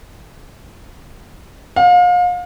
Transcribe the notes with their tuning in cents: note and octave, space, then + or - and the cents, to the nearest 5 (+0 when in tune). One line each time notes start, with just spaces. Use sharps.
F5 +35